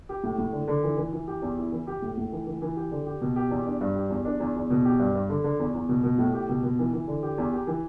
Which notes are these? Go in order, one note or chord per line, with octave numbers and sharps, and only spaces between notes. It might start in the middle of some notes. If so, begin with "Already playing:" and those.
G4
A2
A2
D3
D3
E3
E3
E3
G4
E2
E4
E3
G4
A2
A2
E3
E3
E3
G4
D3
G4
B2
G4
E2
D4
G2
G4
E2
D4
E2
E2
B2
G4
G2
G2
D3
D3
E2
E2
B2
B2
A2
G4
B2
B2
E3
E3
D3
G4
E2
G4
E3